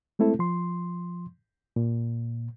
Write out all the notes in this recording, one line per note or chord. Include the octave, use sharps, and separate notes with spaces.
G#3 A3 C4 E4 A4
F3 C6
A#2